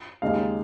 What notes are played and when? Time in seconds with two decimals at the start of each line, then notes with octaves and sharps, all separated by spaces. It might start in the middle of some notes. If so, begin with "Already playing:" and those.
0.22 D#2 C#3 G#3 D#4 F5